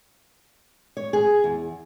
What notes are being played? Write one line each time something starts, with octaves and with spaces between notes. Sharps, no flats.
C#5
G#4
E2